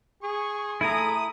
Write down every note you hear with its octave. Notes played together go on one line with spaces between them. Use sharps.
G#4 C#6
A3 E4 G#5 A#5 D#6